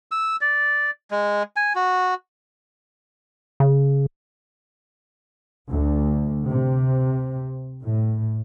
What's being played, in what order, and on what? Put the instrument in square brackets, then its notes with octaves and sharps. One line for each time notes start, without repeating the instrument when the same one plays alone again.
[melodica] E6
D5
G#3
G#5
F#4
[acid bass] C#3
[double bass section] D2
C3
A2